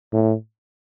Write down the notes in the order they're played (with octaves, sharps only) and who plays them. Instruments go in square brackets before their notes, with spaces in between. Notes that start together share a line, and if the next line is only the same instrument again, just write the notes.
[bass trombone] A2